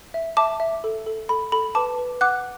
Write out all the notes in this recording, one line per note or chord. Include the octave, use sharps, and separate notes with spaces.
E5
E5 A5 D6
E5
A4
A4
A4 B5
A4 B5
B4 A5 D6
B4
F#5 D6 F#6